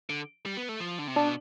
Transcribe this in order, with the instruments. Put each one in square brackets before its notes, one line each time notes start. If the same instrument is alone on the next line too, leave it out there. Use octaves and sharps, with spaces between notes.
[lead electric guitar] D3
G3
B3
A3
F3
D3
C3
[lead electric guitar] B2 [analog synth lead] D4